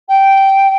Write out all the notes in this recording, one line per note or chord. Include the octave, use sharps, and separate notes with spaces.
G5